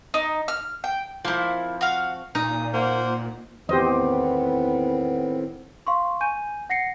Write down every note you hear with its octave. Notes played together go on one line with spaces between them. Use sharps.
D#4
F6
G5
F3 A#3 C4 E4
F#4 F5
A#2 D#4 D#6
A#3 C5 F#5
E2 A2 D#3 B3 C4 G4 C5 D#5
F5 C6 C#6
G#5 G6 D#7
F#5 A#6 C7 C#7